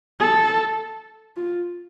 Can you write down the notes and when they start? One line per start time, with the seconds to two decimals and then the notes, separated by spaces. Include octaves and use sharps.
0.20 A4
1.36 F4